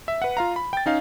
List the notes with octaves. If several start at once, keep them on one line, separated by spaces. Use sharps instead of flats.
E5
B4 F#5
F4 F5 A#5
B5
G5 A6
C#4 D#4 F5